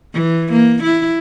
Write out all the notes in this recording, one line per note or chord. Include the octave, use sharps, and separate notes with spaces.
E3
A#3
E4